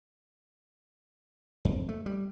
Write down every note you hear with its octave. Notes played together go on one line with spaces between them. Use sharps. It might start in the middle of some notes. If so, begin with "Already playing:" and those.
F2
A3
G3